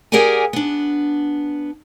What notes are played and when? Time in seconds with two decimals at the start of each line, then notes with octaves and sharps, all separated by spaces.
0.12 G4 G#4 A#4 D5 F#5 G#5
0.53 B3 D4